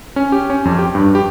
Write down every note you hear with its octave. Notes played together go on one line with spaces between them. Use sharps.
C#4
G4
C#4
F2
G4
G2
G4